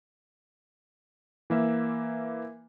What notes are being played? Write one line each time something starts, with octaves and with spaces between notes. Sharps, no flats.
E3 A#3 E5